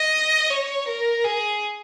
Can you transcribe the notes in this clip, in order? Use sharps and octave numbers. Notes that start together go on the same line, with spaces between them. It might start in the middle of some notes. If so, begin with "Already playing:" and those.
Already playing: D#5
C#5
A#4
G#4